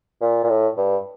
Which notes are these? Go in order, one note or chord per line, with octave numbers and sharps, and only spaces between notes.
A#2
A#2
A2
G2